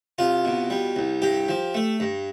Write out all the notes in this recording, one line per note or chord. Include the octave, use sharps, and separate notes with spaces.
C2 F4
B2
G3
C2
G2 G4
F3
A3
G2